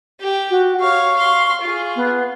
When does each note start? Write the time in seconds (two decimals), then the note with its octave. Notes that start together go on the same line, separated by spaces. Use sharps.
0.20 G4
0.51 F#4
0.80 C#5 F5 C#6
1.16 F5 C6
1.61 F4 G#4
1.96 B3